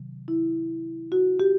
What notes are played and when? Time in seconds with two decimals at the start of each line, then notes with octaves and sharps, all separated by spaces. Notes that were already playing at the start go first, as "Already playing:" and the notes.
Already playing: C3 D#3 F#3
0.28 E4
1.12 F#4
1.40 G4